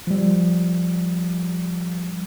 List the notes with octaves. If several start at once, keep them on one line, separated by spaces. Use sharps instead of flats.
F3 G3